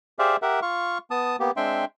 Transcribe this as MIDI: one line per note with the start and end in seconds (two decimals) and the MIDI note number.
0.19 0.36 67
0.19 0.36 68
0.19 0.36 72
0.19 0.36 74
0.19 0.36 76
0.19 0.36 77
0.42 0.60 67
0.42 0.60 70
0.42 0.60 76
0.42 0.60 78
0.62 0.98 65
0.62 0.98 77
0.62 0.98 85
1.11 1.36 59
1.11 1.36 81
1.11 1.36 87
1.40 1.51 58
1.40 1.51 59
1.40 1.51 67
1.57 1.85 56
1.57 1.85 60
1.57 1.85 62
1.57 1.85 76
1.57 1.85 79
1.57 1.85 84